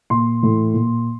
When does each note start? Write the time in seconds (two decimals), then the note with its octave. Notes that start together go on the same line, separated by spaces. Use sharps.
0.10 A#2 C6
0.42 A2 E3
0.74 A#2